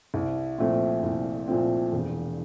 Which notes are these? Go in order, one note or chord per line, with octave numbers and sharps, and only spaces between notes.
C2
A#2 F3 A3 C4
C2
A#2 F3 A3 C4
E1